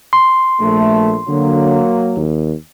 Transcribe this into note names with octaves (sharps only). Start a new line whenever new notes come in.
C6
A#1 A3
D3 F#3 A#3
D#2